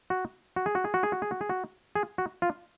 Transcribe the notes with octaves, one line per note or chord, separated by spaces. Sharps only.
F#4
F#4
G#4
F#4
G#4
F#4
G#4
F#4
G#4
F#4
G#4
F#4
G#4
F#4
F4